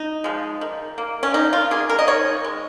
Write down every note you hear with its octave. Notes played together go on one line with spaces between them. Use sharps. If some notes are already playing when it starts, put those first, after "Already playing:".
Already playing: D#4
F3 G#3
D#3
A#3
C#4
D#3 D#4
F4
A#3 G#4
A#4
D#5
D#3 C#5
G#3